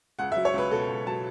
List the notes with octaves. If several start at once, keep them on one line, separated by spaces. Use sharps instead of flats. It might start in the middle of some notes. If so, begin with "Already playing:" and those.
C#2 F#5
E5
F#3
C#5
C#2 B4
B2 A4
C#2
F#3 A5